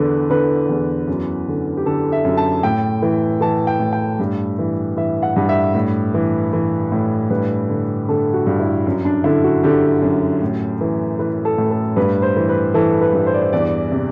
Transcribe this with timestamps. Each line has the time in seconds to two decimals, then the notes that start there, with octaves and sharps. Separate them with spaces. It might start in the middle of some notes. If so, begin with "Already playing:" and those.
Already playing: E2 D3 B4
0.30 D3 B4
0.69 E2
1.07 F#2
1.48 D3
1.77 G4
1.86 D3 A4
2.12 E5
2.25 F#2
2.37 A5
2.63 A2 G5
3.02 E3
3.41 E3 A5
3.67 G5
3.80 A2
3.93 G5
4.19 G2
4.59 E3
4.97 E3 E5
5.23 F#5
5.36 G2
5.49 E5
5.74 A2
6.14 E3
6.53 E3
6.92 A2
7.30 G2 B4
7.69 D3
8.09 D3 A4
8.34 F#4
8.47 G2
8.60 E4
8.86 F#2
9.05 D4
9.24 D3 E4
9.44 F#4
9.63 D3 G4
10.02 F#2
10.42 A2
10.81 E3
11.19 E3 B4
11.45 A4
11.58 A2
11.71 A4
11.96 G2 B4
12.22 C5
12.37 E3
12.49 B4
12.74 E3 A4
13.01 B4
13.13 G2
13.27 C5
13.34 D5
13.41 C5
13.53 E2 D5
13.92 C3